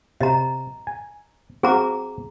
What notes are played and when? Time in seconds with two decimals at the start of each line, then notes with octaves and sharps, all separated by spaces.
0.21 C3 D#5 A#5
0.87 G#5
1.63 C4 F#4 G#4 F5 A#5 D6